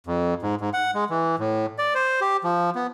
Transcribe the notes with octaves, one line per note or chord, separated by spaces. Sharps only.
F2
G#2
G#2
F#5
G#3
E3
A2
D5
C5
G4
F3
B3